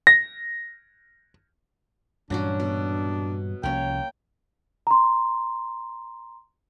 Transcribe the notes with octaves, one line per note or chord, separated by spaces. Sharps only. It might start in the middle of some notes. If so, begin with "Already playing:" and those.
A#6
G2 A#2 E3 F#3 C#4 D4 F#4
B2
C2 F3 A#3 C#4 C#5 G5
A#5 C6